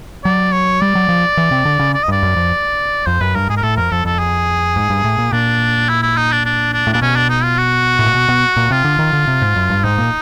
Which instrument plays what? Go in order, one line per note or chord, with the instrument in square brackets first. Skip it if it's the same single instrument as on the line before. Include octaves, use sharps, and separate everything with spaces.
[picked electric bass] F#3 [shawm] D5
[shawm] C#5
[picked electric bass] G3 [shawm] D5
[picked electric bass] F#3
F3
E3
C3
D3
C#3
[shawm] D5
D#5
[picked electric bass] G2 [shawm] D5
[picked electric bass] F#2
F2
[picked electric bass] F2 [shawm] C5
[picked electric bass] F#2 [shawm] B4
[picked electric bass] G2 [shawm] A#4
[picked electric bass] G#2 [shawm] G#4
[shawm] A#4
[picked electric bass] A2 [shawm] A4
[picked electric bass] F2 [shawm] A#4
[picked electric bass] F2 [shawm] A4
[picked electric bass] F2 [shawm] A4
[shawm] G#4
[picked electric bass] G#2
G2
A2
A#2
[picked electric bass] A#2 [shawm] D4
[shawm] E4
E4
D#4
D4
D4
D4
[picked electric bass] A2
[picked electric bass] A#2 [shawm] D4
[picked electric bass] B2 [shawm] C#4
[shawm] D4
D#4
F4
F#4
[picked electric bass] A2
A#2
B2
B2
A#2
[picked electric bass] C3 [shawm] F4
[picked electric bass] D3
D#3
D3
C3
G#2
F#2
G2
[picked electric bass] G#2 [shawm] D#4
[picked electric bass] A#2